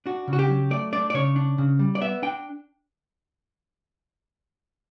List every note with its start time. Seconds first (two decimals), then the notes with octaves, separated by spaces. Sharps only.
0.06 D4 F#4
0.28 C#3
0.33 F#4
0.39 G4
0.49 F#3
0.70 A3 D5
0.93 D4 D5
1.10 D5
1.14 C#3 C#5
1.36 D4
1.58 C#3
1.79 G3
1.95 D5
2.01 B3 E5
2.22 D4 G5